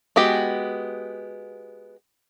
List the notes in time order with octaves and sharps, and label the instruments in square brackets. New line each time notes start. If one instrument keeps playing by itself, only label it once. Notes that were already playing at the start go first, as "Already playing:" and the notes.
[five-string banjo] G#3 B3 F#4 G4